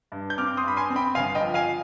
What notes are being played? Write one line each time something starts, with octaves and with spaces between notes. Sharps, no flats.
G2
G6
C4 D6 F6
C6 D#6
G2 B5
G#5 C6
C4
G5 B5
G1 F5 G#5
D#5 G5
F3
F5 G#5